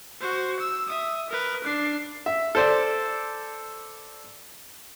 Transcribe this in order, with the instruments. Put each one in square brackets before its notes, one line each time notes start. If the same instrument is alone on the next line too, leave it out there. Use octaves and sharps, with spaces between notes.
[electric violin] F#4 C5
E6
E5 D#6
A#4 B4
D4 C7
[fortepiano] E5
A4 C5 D5